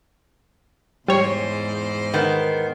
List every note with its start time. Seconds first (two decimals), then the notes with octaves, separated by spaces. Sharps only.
1.08 E2 G#2 G3 C5 C#5
2.14 D#3 B3